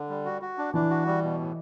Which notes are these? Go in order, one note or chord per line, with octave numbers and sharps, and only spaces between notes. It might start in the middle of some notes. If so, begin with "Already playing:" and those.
Already playing: D3
G3
F#4
F#4
D4
E3 D4
F#4
G3
B2
A2